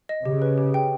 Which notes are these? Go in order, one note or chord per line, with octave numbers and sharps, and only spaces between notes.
D#5
C#3 G4
B4
G4
G5